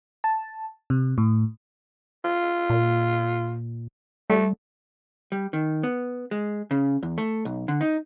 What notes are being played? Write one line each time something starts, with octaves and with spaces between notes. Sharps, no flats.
A5
C3
A2
F4
A#2
G3 A3
G3
D#3
B3
G#3
C#3
E2
A3
B1
D3
D#4